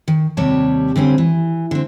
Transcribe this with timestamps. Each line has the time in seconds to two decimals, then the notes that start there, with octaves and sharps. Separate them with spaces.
0.08 D#3
0.37 D#2 C3 G3 C#5 A5
0.96 D3 G3 C4 C#4
1.18 E3
1.71 D3 C4